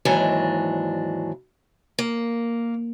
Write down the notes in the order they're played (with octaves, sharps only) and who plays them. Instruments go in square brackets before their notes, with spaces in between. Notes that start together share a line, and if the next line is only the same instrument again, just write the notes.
[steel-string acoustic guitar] D#2 G#2 E3 F#3 D4
A#3